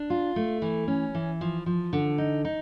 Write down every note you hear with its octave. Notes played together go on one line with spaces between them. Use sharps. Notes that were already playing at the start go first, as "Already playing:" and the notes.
Already playing: D4
F4
A3
E3
C#4
E3
F3
F3
D3
D#4
D#4